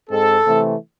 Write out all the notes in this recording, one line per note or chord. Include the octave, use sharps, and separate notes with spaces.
G#2 G#3 C4 A4
C3 E3 A3 C4